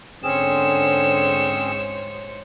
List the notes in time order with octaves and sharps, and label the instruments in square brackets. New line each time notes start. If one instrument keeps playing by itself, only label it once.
[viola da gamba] G#2 C5 C#5 [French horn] D3 [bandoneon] C4 C#4 G#4 [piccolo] E7